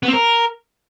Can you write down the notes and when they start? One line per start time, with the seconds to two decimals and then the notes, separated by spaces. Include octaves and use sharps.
0.03 B3
0.08 C4
0.13 A#4